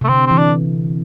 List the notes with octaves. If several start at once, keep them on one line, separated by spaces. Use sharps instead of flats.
C3
A3
D3 C4
E3 C4
D4